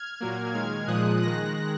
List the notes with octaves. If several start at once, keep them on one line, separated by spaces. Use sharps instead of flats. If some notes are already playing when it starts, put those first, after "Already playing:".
Already playing: F6 G#6
A#2 F#3 A#3
D#3 G#3 F6 G#6
A#2 F3 G#3 D#6 F#6
D#3 G#3 F#6 A#6